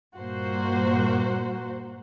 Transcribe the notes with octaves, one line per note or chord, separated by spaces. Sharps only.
G2 A#2 A#3 F#4 C5